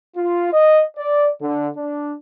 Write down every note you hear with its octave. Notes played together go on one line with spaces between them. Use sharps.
F4
D#5
D5
D3
D4